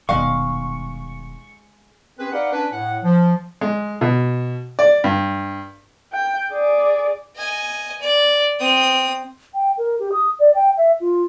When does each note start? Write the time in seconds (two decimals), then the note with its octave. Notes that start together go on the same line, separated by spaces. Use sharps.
0.09 D#1 D#2 B2 G#3 F5 C#6
2.19 C4 C#4 G4 G#4 B4
2.33 D#4 B4 D5 F5 F#5
2.52 C#4 D4 B4
2.73 A2 F#5
3.04 F3
3.61 G#3
4.01 B2
4.79 D5
5.04 G2
6.13 G5
6.52 G#4 D5
7.36 D#5 G#5
8.01 D5
8.59 C4 D#6
9.54 G5
9.78 A#4
9.99 G4
10.12 D#6
10.39 D5
10.55 G5
10.77 E5
11.01 F4